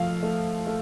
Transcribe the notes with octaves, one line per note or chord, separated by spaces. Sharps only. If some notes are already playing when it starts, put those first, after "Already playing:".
Already playing: F3 A3 F5
A3
A3